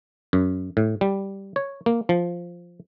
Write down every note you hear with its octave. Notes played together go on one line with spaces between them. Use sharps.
F#2
A2
G3
C#5
A#3
F3